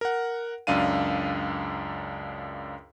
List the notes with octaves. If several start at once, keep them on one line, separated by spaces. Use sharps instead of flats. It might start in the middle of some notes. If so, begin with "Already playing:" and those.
A#4 F#5
C#2 F#2 D4 F5 D#7